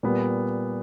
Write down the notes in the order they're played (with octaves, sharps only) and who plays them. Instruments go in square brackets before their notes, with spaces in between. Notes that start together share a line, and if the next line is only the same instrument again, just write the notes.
[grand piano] A#2 G3 B3